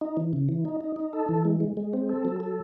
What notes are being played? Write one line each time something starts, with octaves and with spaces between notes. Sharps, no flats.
D#4
E3
C#3
E3
D#4
D#4
D#4
A4
E3
G#3
G#3
G#3
C4
A4
F#3
A4